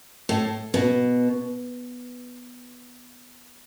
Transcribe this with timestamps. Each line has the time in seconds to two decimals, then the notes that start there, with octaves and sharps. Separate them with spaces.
0.29 A2
0.74 B2